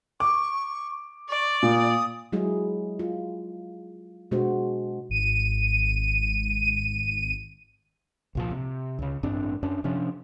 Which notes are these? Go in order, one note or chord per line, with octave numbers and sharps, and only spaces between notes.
C#6 D6
D5 C#6
A#2 D#6
F#3 G#3 E4 G#4
F4
B2 G#3 D4 F#4 C5
G#1 D#7
C2 A#2 F3
C3
C#2 C#3
A1 G2 C4 D4
F#2 C#4 D4
C3 F3 C#4 D4